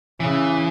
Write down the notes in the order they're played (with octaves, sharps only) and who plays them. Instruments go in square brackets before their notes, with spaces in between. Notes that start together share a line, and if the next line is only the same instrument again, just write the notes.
[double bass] C#3 [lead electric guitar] E3